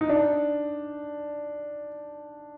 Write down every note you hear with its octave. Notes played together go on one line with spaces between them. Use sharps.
D#4
D4